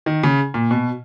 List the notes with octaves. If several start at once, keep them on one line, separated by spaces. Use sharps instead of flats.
D#3
C#3
A#2
B2